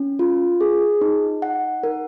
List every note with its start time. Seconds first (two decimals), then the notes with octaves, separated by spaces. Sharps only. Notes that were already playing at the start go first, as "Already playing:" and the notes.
Already playing: C#4
0.19 F4
0.61 G#4
1.01 D#4
1.42 F#5
1.83 A#4